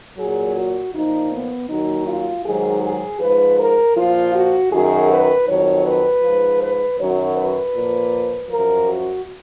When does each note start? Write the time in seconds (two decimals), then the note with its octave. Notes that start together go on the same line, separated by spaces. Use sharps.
0.18 A#2 F#3 G#4
0.57 F#4
0.93 A#2 F3 D#4
1.32 B3
1.69 D#2 D#3 F#3 D#4
2.07 F4
2.44 G#2 D#3 F#3 G#4
2.83 G#4
3.20 G#2 F3 B4
3.58 A#4
3.96 A#2 F3 F4
4.34 F#4
4.71 F#2 D#3 F#3 G#4
5.09 B4
5.47 F2 D#3 F#3 C#5
5.86 B4
6.23 G#2 F3
6.61 B4
6.98 F#2 D#3 F#3 C#5
7.36 B4
7.75 A#2 F3
8.49 F#2 F3 A#4
8.87 F#4